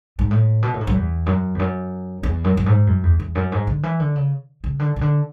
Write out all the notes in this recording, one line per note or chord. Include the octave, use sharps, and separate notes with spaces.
G#2
A2
B2
A2
G#2
F#2
E2
F#2
E2
F#2
E2
F#2
F#2
G#2
F#2
E2
E2
F#2
G#2
D3
E3
D3
C#3
C#3
D3
C#3
D3